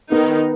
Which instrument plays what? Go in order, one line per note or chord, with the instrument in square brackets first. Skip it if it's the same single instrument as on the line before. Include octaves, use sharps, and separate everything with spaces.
[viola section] D#3 D#4 [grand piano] B3